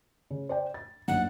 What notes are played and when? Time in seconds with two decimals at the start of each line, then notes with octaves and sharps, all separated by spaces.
0.31 C#3
0.49 C5 D5 G5
0.74 A6
1.08 A#1 F#2 D#4 F#5